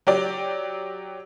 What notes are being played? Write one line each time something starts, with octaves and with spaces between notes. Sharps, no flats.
F#3 G4 D5